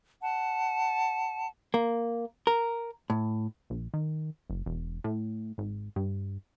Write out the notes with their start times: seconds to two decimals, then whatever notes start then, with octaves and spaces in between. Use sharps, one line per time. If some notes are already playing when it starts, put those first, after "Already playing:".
0.21 F#5 A5
1.74 A#3
2.47 A#4
3.10 A2
3.70 A#1
3.94 D#3
4.50 F#1
4.66 E1
5.04 A2
5.58 G#1
5.96 G2